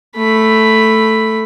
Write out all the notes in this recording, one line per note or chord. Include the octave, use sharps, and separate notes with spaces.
A3 B5